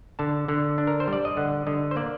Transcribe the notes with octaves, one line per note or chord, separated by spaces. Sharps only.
D3 A5
D3
D4
A#4
C5
G3
D5
D#5
D3 F#5
D3 D#5
C5
A#3 D5